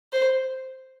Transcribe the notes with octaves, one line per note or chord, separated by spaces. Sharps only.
C5